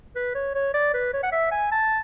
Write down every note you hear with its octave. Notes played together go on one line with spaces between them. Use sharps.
B4
C#5
C#5
D5
B4
C#5
F#5
E5
G#5
A5